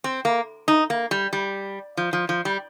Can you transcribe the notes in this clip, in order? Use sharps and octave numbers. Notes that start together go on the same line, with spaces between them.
C4
A#3
D#4
A#3
G3
G3
F3
F3
F3
G3